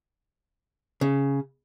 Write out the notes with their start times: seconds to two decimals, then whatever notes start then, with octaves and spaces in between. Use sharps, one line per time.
1.01 C#3